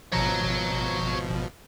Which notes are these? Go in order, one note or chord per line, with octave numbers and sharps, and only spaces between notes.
G#1 B2 F3 C#5 A#5